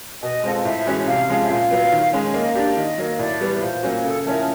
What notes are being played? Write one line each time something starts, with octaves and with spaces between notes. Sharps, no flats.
B2 D#5
G#3 C4 F4 A4
A2 E5
E3 G#3 C#4 F#4
C3 F5
F3 G#3 C#4
E5
A#2 F5
F#3 B3
D#3
G#3 C#4
A#3 D#5
D4 G4 D5
D#3 D#5
F#3 A#3
A2 D5
E3 G3 B3
A#2 C5
F#3 A#3 C#4 F#4
C#3 A4
F3 A3 C#4 E4 A#4